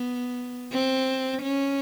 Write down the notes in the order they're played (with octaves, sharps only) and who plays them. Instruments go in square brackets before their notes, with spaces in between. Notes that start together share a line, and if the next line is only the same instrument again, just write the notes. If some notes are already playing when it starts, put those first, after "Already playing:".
Already playing: [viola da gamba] B3
C4
C#4